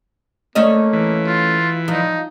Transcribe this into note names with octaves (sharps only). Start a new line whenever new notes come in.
A3 A#3 C#4 D#5
E3
F4
F3 D#4